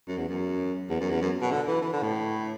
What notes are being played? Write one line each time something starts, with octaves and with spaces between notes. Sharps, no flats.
F#2
E2
F#2
E2
F#2
E2
F#2
B2
D3
E3
E3
D3
A2